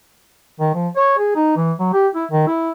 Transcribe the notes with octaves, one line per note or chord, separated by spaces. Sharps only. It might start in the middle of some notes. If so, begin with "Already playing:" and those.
D#3
F3
C#5
G#4
D#4
E3
F#3
G4
E4
D#3
E4